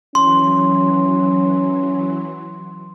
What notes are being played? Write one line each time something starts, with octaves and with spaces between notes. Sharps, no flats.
E3 F#3 C#4 C6